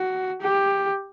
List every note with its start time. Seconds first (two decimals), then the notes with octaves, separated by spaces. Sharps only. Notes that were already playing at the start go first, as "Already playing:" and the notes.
Already playing: F#4
0.42 G4